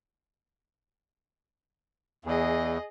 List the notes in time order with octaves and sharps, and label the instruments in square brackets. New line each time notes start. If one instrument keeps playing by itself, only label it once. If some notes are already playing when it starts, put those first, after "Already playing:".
[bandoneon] E2 [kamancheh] G#4 D#5